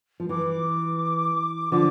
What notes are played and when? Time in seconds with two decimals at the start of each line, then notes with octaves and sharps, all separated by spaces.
0.20 F3
0.29 E3 D6
1.72 D3 F3